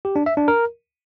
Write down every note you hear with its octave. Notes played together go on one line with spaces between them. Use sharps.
G4
D4
E5
D4
A#4